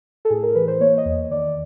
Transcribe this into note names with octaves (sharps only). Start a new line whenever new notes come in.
A4
A2 G#4
A#4
E3 B4
C5
A#3 C#5
D#5
E2
D#3 D5